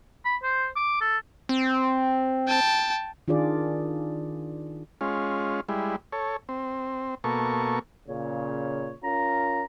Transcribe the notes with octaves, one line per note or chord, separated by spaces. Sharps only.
B5
C5
D6
A4
C4
G5 A5
D#3 D4 F4 G#4 D5
G#3 C#4 F4
G3 G#3 E4
A4 C#5
C4
B2 A#3 A4 C#6
A#2 C#3 C#5
C#4 F4 A#4 A#5